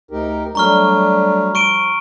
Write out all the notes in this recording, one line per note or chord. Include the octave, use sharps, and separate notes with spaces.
D2 D#4 G4 A#4
F#3 G3 A3 D4 A#5 C#6 F6
F3 C#6 D7 D#7